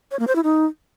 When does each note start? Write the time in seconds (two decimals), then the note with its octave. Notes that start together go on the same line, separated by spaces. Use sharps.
0.11 C#5
0.19 A#3
0.27 C5
0.36 E4
0.44 D#4